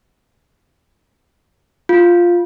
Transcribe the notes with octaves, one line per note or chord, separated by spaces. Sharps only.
F4